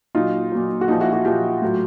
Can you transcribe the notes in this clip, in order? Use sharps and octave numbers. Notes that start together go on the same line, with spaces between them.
A#2 F#3 D#4 F4
A#2 F#3
F#4
A#2 F3 D#4 F4
E4 F#4
E4 F#4
A#2 F3 F4 G4
A2 F#3